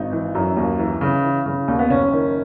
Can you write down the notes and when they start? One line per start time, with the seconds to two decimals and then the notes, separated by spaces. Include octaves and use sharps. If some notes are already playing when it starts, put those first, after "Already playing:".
Already playing: G#1 D#4
0.12 E3
0.35 F#2
0.57 D#2
0.79 E3
1.01 C#3
1.23 E3
1.46 C#3
1.68 D#2
1.79 B3
1.90 F#1 C#4
2.12 D#3